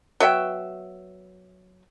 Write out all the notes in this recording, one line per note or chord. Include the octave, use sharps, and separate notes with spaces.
F#3 B3 E5 G5